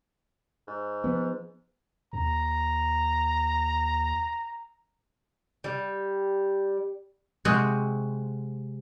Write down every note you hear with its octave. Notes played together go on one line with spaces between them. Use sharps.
G#2
F3 B3
D#2 A#5
G3
C3 G#3 C4 F#4